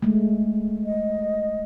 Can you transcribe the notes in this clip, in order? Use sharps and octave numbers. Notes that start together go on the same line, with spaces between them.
G#3 A3
D#5